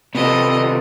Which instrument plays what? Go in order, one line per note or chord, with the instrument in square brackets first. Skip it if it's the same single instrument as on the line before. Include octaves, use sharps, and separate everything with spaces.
[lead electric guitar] C3 [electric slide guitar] B3 F4 A4 [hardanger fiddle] D#5